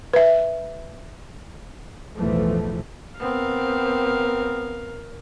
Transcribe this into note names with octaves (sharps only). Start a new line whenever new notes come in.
B4 E5
B1 E2 A2 E3 F3 A3
B3 C4 A#4 F5